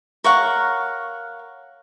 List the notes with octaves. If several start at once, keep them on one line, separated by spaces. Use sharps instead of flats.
A#4 C#5 F5 F#5